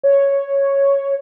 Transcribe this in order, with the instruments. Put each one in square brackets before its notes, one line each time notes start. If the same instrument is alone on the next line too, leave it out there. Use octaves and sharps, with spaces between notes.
[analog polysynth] C#5